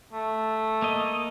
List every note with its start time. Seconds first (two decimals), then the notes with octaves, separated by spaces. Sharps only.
0.13 A3
0.82 A#3 D#5